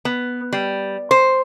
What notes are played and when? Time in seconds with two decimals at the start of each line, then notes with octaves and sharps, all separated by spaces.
0.05 B3
0.53 G3
1.11 C5